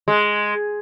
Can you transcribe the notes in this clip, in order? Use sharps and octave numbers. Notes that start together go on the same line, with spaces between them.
G#3